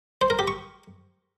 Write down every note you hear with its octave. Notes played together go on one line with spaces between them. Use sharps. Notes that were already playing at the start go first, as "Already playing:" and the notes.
C5
A#4
G4
C#6